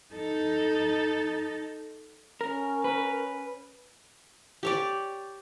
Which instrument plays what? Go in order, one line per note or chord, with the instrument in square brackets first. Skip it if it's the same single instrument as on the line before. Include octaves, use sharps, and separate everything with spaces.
[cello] D#4 A4
[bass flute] C#4 [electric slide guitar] A#4
[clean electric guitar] B4
[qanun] G4 C#5 D5